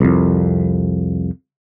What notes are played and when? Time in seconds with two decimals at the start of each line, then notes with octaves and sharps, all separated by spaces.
0.01 C2 F2